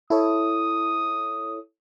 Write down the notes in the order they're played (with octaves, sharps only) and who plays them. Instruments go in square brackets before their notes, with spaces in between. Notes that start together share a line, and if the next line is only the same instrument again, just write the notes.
[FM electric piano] E4 A4 C#5 [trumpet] D#6